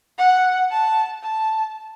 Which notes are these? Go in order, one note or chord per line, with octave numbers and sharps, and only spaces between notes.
F#5
A5
A5